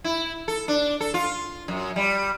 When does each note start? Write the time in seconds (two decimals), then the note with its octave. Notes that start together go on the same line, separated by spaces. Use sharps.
0.04 E4
0.48 A4
0.68 D4
1.00 A4
1.14 F4
1.68 F#2
1.96 G3